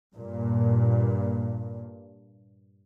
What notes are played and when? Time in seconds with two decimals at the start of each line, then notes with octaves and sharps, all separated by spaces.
0.14 G2 A#2